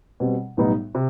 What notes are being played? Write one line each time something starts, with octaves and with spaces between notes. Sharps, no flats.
B2 G3 C4
B1 A2 G3 B3 D#4
C3